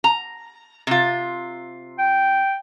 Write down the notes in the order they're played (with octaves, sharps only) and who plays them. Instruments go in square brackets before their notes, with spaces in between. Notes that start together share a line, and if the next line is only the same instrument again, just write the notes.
[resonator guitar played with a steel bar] A#5
C3 F4
[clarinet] G5